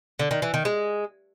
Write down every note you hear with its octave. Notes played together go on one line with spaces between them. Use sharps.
D3
D#3
E3
D#3
G#3